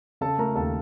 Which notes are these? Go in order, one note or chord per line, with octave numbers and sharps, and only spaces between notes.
C#3 A4 A5
A3 A#4 A#5
D#2 A4 A5